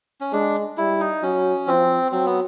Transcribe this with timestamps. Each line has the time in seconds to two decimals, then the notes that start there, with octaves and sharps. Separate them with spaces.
0.21 C#4
0.33 G#3 D4
0.77 G3 E4
1.00 D#4
1.22 F#3 C#4
1.68 F3 C4
2.12 F#3 C4
2.26 B3